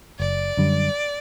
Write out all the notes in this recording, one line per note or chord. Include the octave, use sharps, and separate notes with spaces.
F#1 D5
F#2 D3 G3